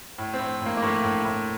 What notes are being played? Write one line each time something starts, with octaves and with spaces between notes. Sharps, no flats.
A2
C4
A2
A2
A#3
A#3
A2 A3
A2
A2